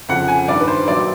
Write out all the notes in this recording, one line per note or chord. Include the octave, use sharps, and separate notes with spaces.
F2 C#3 F3 F#5
G#5
G2 D#3 G3 D5
B4
C5
A#1 A#2 F#3 D5